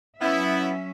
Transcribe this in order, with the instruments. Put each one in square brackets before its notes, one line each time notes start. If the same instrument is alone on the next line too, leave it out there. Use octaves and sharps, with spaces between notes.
[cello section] F#3 C#4 E5 [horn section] B3 E4